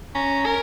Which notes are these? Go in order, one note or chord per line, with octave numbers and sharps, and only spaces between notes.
C#4 A#5
A#4 G#5